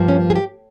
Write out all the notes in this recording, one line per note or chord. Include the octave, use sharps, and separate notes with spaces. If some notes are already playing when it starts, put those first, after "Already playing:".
Already playing: G2 F3 A#3
C#4
G#4
G4